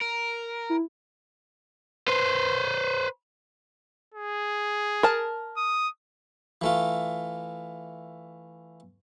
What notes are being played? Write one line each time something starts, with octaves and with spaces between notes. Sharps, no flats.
A#4
E4
B4 C5
G#4
A#4 A5
D#6
E3 A3 F4